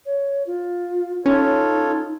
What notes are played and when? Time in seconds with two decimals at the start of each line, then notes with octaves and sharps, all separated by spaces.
0.06 C#5
0.47 F4
1.26 C#4 D#4 F4 A4 C#5